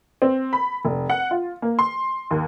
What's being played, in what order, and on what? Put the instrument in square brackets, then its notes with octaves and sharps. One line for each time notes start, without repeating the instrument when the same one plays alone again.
[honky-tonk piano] C4
B5
F1
F#5
F4
A#3
C6
D#2